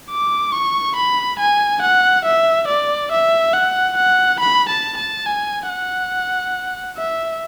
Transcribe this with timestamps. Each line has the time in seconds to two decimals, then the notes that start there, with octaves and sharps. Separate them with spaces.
0.11 D6
0.52 C#6
0.96 B5
1.39 G#5
1.82 F#5
2.25 E5
2.68 D5
3.12 E5
3.53 F#5
3.97 F#5
4.40 B5
4.69 A5
4.97 A5
5.26 G#5
5.69 F#5
6.98 E5